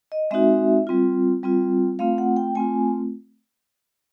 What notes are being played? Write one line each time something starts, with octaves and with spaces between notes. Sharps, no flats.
D#5
G#3 C4 D#4 F#4 E5
G3 C4 F4
G3 C4 F4
A3 C4 F4 F5
F#5
G5
A3 C4 F4 G#5